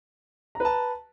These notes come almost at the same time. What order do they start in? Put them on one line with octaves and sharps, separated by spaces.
A#5 B4 A5